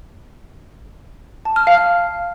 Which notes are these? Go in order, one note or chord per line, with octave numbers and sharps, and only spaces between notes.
A5
F6
F5
F6